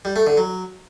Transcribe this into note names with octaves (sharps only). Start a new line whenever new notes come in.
G3
A3
D3
F#3